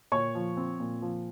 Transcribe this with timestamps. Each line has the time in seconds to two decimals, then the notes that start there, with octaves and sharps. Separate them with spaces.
0.12 A#2 C#5 C#6
0.35 F3
0.57 C4
0.80 A#2
1.02 F3